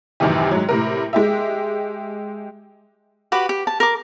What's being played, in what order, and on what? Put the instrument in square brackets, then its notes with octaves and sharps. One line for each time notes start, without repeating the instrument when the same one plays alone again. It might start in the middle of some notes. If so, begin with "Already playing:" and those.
[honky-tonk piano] A1 F#2 C3 D#3 E3 G4
G#2 F#3
A2 C3 A#4
G#3 G4 E5
[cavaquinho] F#4 G4 B4 D6
G4
A5
A#4 D6